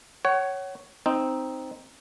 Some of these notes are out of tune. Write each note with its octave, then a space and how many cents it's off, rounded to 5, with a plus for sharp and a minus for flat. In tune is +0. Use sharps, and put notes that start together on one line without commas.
C#5 +0 F#5 +35
C4 +0 D#4 +0